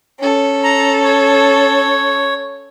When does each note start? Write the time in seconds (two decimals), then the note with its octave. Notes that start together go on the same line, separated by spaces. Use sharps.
0.18 C#4 A4
0.64 A#5
1.04 C#5